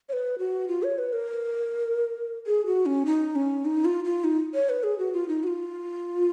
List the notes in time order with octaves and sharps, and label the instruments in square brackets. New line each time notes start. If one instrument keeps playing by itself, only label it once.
[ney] C#5
B4
F#4
F4
C#5
B4
A#4
G#4
F#4
C#4
D#4
C#4
D#4
F4
F4
D#4
C#5
B4
G#4
F#4
F4
D#4
F#4
F4